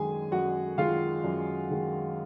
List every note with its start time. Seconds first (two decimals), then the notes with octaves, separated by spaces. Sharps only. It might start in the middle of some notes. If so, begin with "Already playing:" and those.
Already playing: F#2 D#3 G#3 G#4 G#5
0.32 F#2 F#4 F#5
0.78 D#3 G#3 F4 F5
1.24 F#2
1.70 D#3 G#3